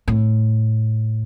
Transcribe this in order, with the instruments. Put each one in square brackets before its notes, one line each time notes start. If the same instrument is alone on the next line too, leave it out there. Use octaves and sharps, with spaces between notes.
[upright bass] A2